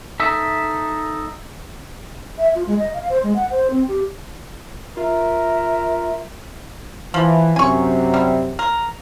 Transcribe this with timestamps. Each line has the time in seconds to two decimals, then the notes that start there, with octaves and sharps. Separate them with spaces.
0.20 D#4 A4 E5
2.38 E5
2.55 F4
2.67 G#3
2.78 D#5
2.94 F5
3.09 C5
3.23 G#3
3.36 F#5
3.51 C5
3.70 C4
3.88 G4
4.97 F4 A#4 E5
7.14 E3 F3
7.56 F#2 C3 F#3 G#5 C#6
8.14 G3
8.59 A#4